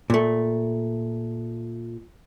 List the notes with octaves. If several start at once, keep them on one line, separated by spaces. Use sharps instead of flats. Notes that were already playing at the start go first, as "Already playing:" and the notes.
A#2 A3